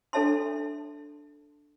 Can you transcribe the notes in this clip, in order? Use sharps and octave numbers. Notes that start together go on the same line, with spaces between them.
D4 A4 C#5 E5 A5 C6